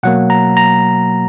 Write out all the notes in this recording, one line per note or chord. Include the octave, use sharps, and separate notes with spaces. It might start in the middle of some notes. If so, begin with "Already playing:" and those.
B2 F#3 A#3 F#5
A#5
A#5